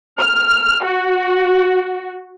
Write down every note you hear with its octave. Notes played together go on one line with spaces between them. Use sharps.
F6
F#4